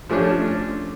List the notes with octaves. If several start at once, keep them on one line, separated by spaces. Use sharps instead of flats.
F3 A3 C#4 D4